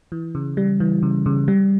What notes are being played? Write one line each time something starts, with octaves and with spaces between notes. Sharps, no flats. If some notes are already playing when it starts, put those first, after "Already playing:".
E3
C#3
G3
E3
C#3
C#3
G3